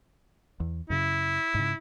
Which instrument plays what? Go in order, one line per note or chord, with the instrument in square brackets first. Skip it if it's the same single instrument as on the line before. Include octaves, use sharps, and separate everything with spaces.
[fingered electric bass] E2
[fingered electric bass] F#2 C#3 [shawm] E4
[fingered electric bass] G#2 C#3